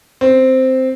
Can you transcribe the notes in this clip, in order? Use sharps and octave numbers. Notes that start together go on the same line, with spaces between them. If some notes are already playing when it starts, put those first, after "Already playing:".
C4